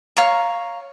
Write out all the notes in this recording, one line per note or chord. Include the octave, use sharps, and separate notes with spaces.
C#5 F5 A#5 C#6